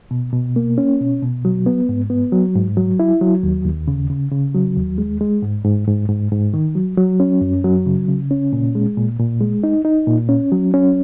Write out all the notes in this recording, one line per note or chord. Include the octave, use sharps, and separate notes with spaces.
B2
B2
A#3
C#4
B2
B2
F#3
B3
G#2
B3
F#3
G#2
F#3
E4
F#3
D#2
D#2
C#3
C#3
C#3
F#3
D#2
G#3
G#3
G#2
G#2
G#2
G#2
G#2
D#3
F#3
F#3
C#4
F#2
F#3
C#3
C#3
C#4
A#2
G#3
A#2
A#2
G#3
D#4
D#4
A#2
C#4
F#3
C#4